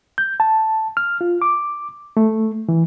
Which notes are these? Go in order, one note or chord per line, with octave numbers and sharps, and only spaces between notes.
G6
A5
F6
F4
D6
A3
E3